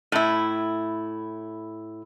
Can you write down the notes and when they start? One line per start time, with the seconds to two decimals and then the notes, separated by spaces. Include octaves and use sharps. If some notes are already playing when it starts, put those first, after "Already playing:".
0.12 A2 E4